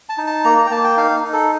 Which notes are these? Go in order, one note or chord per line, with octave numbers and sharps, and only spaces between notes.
A5
D#4
A5
A#3 A#5
A#5
G5
A#3 A5
G5
D#4 F5
D#4
A4